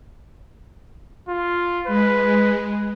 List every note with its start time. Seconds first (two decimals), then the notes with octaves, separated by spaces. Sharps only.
1.28 F4
1.87 G#3 B4